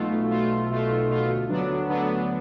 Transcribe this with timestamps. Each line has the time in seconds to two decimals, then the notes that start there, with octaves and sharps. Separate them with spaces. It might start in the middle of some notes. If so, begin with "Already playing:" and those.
Already playing: B1 B2 A3 F4
0.10 B1
0.30 B2 A3 F4
0.50 B1
0.70 B2 A3 F4
0.89 B1
1.09 B2 A3 F4
1.30 D2
1.49 D3 F#3 B3 D4
1.69 D2
1.89 D3 F#3 B3 D4
2.09 D2